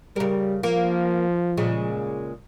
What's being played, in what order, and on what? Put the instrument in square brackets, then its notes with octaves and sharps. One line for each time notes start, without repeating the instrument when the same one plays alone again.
[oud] C#3 A#4 [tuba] G3
[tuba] F3 [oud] A#3
[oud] A#2 C#3 G#3